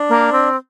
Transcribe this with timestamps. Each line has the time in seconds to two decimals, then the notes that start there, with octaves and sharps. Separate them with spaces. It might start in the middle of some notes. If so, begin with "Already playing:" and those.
Already playing: D4
0.09 A#3
0.32 C4